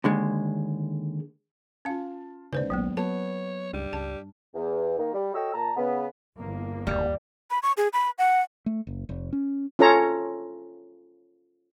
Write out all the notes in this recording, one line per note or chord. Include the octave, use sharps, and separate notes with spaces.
D#2 D3 G#3
C#4 F4 F5 A5
A1 D#2 G#2 C#3 B4 C5 D5
A#1 F#3 A#3 B3
F#3 B3 C#5 A5
C#2 G2 G3
C#2 A5
E2
D#3 A#3
G3
F#4 A4 C#5 D#5 G5 E6
A#2 A5 A#5
C#3 B3
G1 E2 A#3
E1 D#2 G3
B5
C#6
G#4
B5
F#5
A3
F#1
F1
C#4
C#4 F4 A4 C#5 A#5